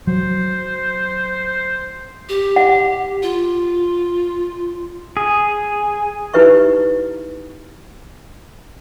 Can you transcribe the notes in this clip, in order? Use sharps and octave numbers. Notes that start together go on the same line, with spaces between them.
F#3 C5
G4
F#5
F4
G#4
D#4 E4 G4 B4 E5 C#6